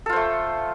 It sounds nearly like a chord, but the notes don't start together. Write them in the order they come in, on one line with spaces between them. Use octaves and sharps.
A4 F4 C5 A3